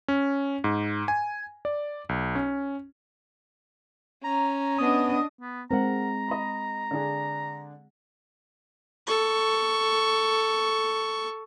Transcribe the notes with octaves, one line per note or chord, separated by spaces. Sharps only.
C#4
G#2
G#5
D5
B1
C#4
C#4 A#5
B3 D4 D#5 D#6
B3
G#3 C4 A#4 F#5 A#5
D#5 B5
D3 D4 G#4
A4 C#6